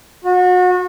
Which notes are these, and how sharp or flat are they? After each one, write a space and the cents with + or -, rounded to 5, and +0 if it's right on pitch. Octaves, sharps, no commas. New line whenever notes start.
F#4 -30